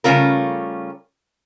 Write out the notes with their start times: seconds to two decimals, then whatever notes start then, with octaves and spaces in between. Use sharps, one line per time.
0.04 C#3 G3 A3 C#4 F4 A#4